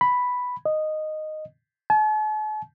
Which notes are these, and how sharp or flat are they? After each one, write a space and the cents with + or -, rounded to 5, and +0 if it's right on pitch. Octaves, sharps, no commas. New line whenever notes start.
B5 +0
D#5 -10
A5 -45